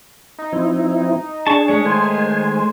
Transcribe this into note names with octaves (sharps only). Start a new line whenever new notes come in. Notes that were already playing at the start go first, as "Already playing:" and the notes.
D#4
F3 C4 E4
D4 G#4 A5 C#6
G#3 A3 C#5
D#3 C5 G#5